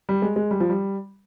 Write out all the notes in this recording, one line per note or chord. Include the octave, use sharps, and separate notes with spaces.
G3
G#3
G#3
G3
F3
G3